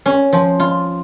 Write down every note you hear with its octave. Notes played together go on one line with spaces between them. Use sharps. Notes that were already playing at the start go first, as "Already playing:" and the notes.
C#4
F3
F4